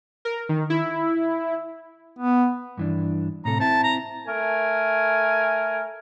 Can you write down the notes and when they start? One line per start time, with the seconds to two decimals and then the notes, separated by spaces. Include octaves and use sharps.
0.25 A#4
0.49 D#3
0.70 E4
2.19 B3
2.77 G2 E3 D4
3.45 A2 C3 A4 A#5
3.60 C4 E4 A5
3.83 A#5
4.27 A3 A#4 G#5